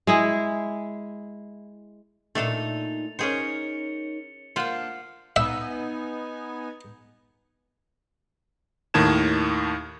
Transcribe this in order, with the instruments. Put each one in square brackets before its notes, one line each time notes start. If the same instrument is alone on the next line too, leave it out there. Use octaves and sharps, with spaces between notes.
[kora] G#3 E4 G#4
[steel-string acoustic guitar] A#2 D#4 [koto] A3 D4 A4 [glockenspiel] A6 F7
[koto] C#4 G#4 C5 [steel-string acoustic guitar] D#4 A#4 C#5 [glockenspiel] C#7 G7
[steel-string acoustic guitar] A#3 D4 [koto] F4 C5 F#5 [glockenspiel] F6 C7
[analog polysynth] B3 D#4 G#5 [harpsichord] E5
[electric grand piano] D#2 A2 D#3 A5 G#6 E7